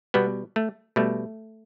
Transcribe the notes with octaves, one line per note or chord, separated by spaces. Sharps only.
B2 G3 B3
A3
B2 G3 A3